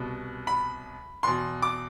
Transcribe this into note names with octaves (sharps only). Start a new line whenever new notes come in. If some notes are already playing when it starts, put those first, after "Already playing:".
Already playing: C2 B2
B5
E2 B2 C6
D6